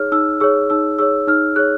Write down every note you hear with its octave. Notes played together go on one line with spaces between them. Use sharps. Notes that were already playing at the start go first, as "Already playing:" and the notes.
Already playing: D#4 G#4 C#5 F6
D#4 E6
G#4 C#5 E6
D#4 E6
G#4 C#5 E6
D#4 F6
G#4 C#5 F#6